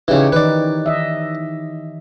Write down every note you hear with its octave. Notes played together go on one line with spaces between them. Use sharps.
C#3 E3 D#4 G4 C#5
D#3 E3 D#4 B4 D5
D#5 E5